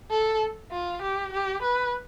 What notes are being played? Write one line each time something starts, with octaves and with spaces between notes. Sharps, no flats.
A4
F4
G4
G4
B4